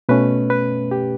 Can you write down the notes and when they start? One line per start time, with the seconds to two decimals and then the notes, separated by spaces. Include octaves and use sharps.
0.09 B2 A3 C#4 B4
0.50 B4
0.91 G4